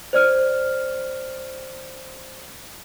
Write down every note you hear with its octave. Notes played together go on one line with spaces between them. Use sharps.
C5 D5 F6